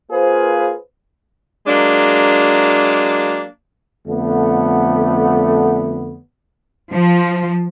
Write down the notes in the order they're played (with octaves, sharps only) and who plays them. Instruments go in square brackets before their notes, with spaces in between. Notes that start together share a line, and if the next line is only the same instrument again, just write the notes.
[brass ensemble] A#3 F4 G#4 B4 C5
[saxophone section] F#3 G#3 A#3 D4
[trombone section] F2 D3 A3 B3
[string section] F3